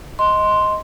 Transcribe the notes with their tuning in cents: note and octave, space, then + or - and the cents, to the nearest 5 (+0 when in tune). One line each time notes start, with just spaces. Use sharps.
D#5 +10 C6 +0